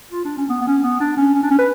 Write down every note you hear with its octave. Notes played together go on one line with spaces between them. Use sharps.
F4
D4
C#4
B3
B3
C#4
B3
D4
C#4
C#4
D4
C#4
B4